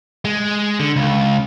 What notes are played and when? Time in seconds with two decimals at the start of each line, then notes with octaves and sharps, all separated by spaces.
0.25 G#3
0.80 D3
0.96 C#2